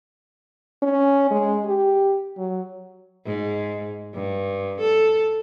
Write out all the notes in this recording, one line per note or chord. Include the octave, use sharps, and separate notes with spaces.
C#4
G#3
G4
F#3
G#2
G2
A4